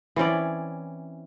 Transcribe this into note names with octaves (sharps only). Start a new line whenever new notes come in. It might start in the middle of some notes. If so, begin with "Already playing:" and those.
E3 C4 C#4 D5